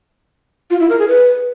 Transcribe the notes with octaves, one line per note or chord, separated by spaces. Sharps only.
F4
E4
A#4
G#4
B4